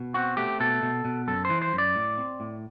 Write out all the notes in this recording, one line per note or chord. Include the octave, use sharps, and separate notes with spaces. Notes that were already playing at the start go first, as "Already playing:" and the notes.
Already playing: B2
C4 F#4
A3 G4
B2 A4
B2
B2
F#2 A4
C5
E3
C5
F#2
D5
A2
C4
A2